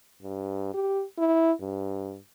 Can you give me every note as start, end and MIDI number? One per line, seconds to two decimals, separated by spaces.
0.22 0.73 43
0.74 1.03 67
1.18 1.52 64
1.61 2.18 43